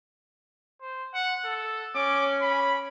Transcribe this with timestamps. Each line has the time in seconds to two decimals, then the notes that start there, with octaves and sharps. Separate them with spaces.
0.82 C5
1.14 F#5
1.45 A4
1.95 C#4 D6
2.42 B5